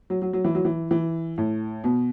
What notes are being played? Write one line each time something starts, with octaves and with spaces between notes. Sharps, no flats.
F#3
F#3
F#3
E3
F#3
E3
E3
A2
B2